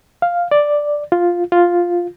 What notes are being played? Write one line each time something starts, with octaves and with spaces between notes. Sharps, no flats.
F5
D5
F4
F4